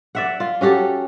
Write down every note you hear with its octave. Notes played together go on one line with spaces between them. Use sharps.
D5 E5 F#5
F4
C#4 F#4 G4 A4